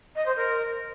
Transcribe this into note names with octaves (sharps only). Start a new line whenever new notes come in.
D#5
C5
A#4